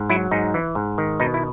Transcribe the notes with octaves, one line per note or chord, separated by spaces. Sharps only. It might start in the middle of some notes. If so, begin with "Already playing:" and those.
Already playing: G#2
F#3 E4
G#2 D#4
E3
G#2
D#3
B2 D#4
E4